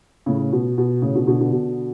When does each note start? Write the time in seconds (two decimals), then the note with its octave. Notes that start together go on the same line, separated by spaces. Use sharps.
0.26 A2 C#3
0.53 B2
0.78 B2
1.02 A2 C#3
1.15 B2 D3
1.27 B2 D3
1.40 B2 D3
1.52 B2 D3